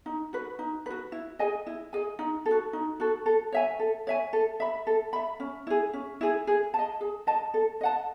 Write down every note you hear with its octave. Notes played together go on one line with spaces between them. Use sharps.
D#4
F#4 B4
D#4
F#4 B4
E4
G#4 D#5 G#5
E4
G#4 D#5 G#5
D#4
A4
F#4
D#4
F#4 A4
A4
C#5 E5 G#5
A4
C#5 E5 G#5
A4
E5 B5
A4
E5 B5
C#4
E4 G#4
C#4
E4 G#4
G#4
D#5 A5
G#4
D#5 A5
A4
D#5 F#5 A5